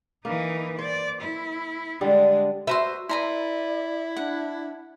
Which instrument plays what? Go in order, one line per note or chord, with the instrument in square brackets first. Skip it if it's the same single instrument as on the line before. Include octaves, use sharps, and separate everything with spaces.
[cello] E3 D#4 [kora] A#3
[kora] C5 [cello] D5
[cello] E4
[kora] D3 G3 [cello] G#3 D4
[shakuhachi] F#4 [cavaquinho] B4 A#5 C6 [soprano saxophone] C5 [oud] E5
[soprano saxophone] E4 [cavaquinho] B4 A#5 C6 [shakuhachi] D5
[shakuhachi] D4 [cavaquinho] F#5